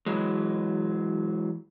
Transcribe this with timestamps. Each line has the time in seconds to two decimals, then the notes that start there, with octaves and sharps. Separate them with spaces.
0.06 E3 F#3 G#3